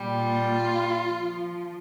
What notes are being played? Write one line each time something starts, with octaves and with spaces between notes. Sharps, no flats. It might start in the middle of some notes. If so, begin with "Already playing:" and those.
Already playing: A#2 G3
F4
F3